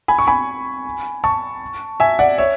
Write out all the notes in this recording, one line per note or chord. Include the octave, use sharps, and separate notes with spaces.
G#5 B5
C#6
G#5 B5
A5 C#6
E5 G#5
D5 F#5
C#5 E5